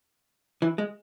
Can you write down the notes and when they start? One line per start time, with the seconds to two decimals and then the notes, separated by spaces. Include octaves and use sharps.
0.62 E3
0.78 G#3